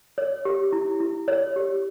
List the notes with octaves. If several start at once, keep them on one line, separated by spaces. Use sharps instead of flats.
C#5
G4
E4
E4
C#5
G4